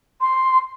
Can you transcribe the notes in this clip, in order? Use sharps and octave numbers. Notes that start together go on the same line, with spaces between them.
C6